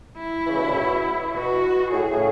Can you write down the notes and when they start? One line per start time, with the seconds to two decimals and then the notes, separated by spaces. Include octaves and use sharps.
0.18 E4
0.47 C#3 E3
0.57 B2 D3
0.66 A2 C#3
0.76 B2
1.34 B2 F#4
1.91 A2 G#4
2.11 A2 C#3